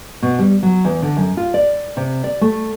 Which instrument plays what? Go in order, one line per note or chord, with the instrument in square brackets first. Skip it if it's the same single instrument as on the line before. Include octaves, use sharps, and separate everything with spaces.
[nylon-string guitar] B2
G3
F#3
E2
D3
F#2
F4
D5
C3
D5
A3